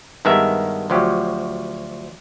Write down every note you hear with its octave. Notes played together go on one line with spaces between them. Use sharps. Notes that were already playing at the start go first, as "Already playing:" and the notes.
G2 D#3 G#3 B3 A#4 E5
D2 F3 F#3 G4